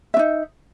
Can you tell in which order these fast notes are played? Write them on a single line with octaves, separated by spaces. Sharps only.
E5 D4 D#4